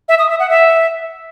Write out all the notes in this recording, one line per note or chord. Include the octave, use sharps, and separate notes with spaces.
E5
D#6
E5
F#5
E5